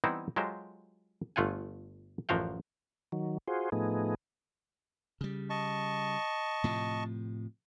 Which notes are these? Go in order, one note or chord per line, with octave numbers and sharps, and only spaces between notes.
E3 G3 B3 C4 D#4 E4
F#3 G#3 F4 G4 A4 C5
G1 A3 F4 F#5 G#5
A1 F#2 F3 F#4 F5 G5
D#3 F#3
F4 F#4 G#4 C5
A2 F3 A3 B3 D#4 G#4
C#3 G3
D#5 A5 C#6
A2 C3 F3